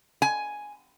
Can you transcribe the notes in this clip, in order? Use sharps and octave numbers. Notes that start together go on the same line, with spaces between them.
G#5